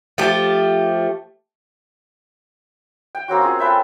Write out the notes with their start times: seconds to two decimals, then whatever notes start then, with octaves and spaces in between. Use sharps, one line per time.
0.18 F3 A3 G4
3.15 G5
3.28 A#3 C4 C#4 F#4
3.42 F4 G#4
3.59 A4 B4 E5 G5